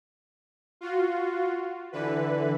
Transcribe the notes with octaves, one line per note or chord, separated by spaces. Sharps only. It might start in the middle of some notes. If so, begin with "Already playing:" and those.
F4 F#4
D3 E3 B4